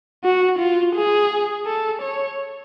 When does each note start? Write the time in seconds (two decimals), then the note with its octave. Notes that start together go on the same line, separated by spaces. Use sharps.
0.24 F#4
0.59 F4
0.95 G#4
1.66 A4
2.02 C#5